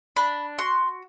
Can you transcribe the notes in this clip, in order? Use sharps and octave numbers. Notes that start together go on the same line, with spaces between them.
D4 B5
F#4 C6